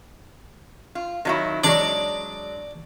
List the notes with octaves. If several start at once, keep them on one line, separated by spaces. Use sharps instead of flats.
F4
D#3 F#3 E4
F#3 G#3 D4 D5